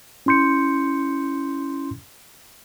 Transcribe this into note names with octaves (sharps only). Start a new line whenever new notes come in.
C#4 E4 C6 G6 C#7